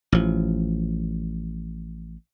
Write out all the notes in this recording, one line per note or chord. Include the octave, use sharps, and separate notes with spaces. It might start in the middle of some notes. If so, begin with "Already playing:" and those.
A1 F3